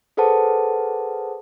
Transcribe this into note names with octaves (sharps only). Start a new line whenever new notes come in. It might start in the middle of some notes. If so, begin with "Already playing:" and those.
G#4 A4 B4 C5 F#5 A5